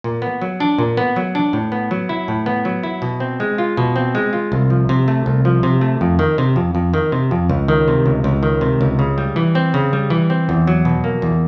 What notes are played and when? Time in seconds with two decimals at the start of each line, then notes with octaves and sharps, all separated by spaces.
0.04 A#2
0.22 B3
0.41 F#3
0.60 D4
0.78 A#2
0.97 B3
1.16 F#3
1.35 D4
1.53 A2
1.72 B3
1.91 F#3
2.09 E4
2.28 A2
2.46 B3
2.65 F#3
2.83 E4
3.02 B2
3.20 C4
3.40 G#3
3.58 F4
3.77 B2
3.96 C4
4.15 G#3
4.33 F4
4.52 C2
4.70 F3
4.89 C3
5.08 A3
5.26 C2
5.45 F3
5.63 C3
5.81 A3
6.01 F2
6.19 D#3
6.38 C3
6.56 F2
6.75 F2
6.94 D#3
7.12 C3
7.31 F2
7.50 C#2
7.68 D#3
7.88 C3
8.06 C#2
8.24 C#2
8.43 D#3
8.61 C3
8.81 C#2
8.99 C#3
9.18 G3
9.36 E3
9.55 C4
9.74 C#3
9.93 G3
10.10 E3
10.30 C4
10.49 E2
10.67 F#3
10.85 B2
11.04 A#3
11.22 E2